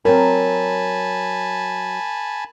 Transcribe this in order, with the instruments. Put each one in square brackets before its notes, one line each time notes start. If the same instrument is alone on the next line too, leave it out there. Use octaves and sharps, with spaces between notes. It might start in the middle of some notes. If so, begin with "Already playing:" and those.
[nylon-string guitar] F#3 C4 [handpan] A#4 [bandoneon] G#5 A5 B5